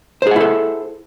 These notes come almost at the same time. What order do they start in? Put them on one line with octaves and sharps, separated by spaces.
C5 G#4 F#5 E4 A4